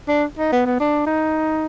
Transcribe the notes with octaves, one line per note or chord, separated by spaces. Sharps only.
D4
D#4
B3
B3
D4
D#4